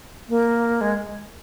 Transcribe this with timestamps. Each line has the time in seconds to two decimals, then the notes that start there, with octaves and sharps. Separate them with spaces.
0.29 A#3
0.81 G#3